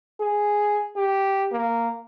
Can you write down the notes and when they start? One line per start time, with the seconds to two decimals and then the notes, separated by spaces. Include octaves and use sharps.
0.20 G#4
0.96 G4
1.52 A#3